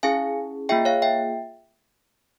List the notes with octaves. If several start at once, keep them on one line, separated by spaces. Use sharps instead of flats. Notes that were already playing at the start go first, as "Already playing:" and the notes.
C#4 E4 G#4 F5 G#5
A#3 F4 G#4 E5 G5
C#5 F5
E5 G5